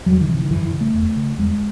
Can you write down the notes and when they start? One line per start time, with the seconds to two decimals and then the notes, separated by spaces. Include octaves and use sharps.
0.06 E2 F#3
0.21 D#3
0.28 C3 E3
0.45 D#3
0.51 F#2 E3
0.72 C#3
0.81 A3
0.94 E2
1.16 C#3
1.38 E2 G#3